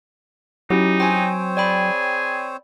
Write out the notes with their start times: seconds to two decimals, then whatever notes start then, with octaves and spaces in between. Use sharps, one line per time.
0.70 F#3 C#4 D#4 E4 G4
1.00 C4 C5 C#5 G5 G#5
1.57 G#4 D5 G5 B5